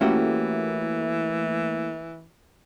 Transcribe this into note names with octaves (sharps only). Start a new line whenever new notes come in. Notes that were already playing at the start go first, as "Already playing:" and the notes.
E3 A3 A#3 C#4 E4 F#4 G4